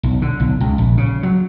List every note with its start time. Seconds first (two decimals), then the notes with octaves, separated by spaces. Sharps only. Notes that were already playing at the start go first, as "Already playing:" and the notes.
0.03 B1
0.22 D3
0.40 B1
0.61 C#2
0.78 A#1
0.97 C#3
1.23 F#3